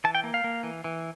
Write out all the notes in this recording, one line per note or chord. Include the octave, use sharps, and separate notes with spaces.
E3 A5
G5
A#3
F5
A#3
E3
E3